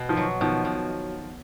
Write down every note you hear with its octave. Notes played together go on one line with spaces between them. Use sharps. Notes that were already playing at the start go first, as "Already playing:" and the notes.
Already playing: B2 B3
D#3 F3
F#3
B2 D#3 F3
B2